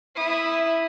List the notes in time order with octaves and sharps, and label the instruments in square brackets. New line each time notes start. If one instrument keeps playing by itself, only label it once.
[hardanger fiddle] E4 D#6